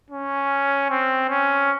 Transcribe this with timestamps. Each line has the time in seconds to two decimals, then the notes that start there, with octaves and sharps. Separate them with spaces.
0.10 C#4
0.90 C4
1.29 C#4